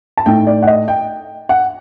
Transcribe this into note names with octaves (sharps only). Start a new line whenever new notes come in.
A5
A2 A3 D#4 G5
D5
F#5
D#5
G5
F#5